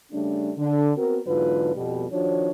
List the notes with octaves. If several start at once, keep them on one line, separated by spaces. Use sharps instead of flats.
C#3 G3 A3 C#4 D4
D3
B3 C4 F#4 A#4
E2 G#2 D3 F#3 F4 B4
F2 B2 G3
D#3 F3 D4 F#4 C#5